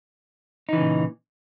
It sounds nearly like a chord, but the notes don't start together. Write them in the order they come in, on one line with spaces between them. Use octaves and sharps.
D#4 E3 C#3 A#2